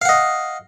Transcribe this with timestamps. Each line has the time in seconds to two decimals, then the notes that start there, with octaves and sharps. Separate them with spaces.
0.02 F5
0.05 F#5
0.09 D#5